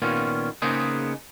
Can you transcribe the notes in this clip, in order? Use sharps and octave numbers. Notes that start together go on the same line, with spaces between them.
A#2 D#3 B3 C#4 F4
C#3 A#3 B3 D#4 G#4 C5